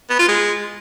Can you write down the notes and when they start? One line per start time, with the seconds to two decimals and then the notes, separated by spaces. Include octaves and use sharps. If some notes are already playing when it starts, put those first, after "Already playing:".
0.10 B3
0.19 F4
0.29 G#3